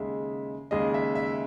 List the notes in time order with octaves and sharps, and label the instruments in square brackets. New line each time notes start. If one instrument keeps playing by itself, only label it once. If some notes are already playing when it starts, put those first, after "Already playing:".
Already playing: [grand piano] D#2 C#3 G#3 E5
D#2 C#3 G#3 D#5
E5
E5